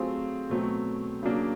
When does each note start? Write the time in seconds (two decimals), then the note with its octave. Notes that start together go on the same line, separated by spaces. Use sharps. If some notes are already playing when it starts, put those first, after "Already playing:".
Already playing: F#3 A3 C4 F4 G#4
0.49 B2 F#3 A3 C4
1.23 C#3 F#3 A#3 D4